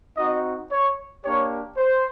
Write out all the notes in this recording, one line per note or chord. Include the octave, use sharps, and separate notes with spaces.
C4 D#4 F#4 D#5
C#5
A#3 D4 G4 C#5
C5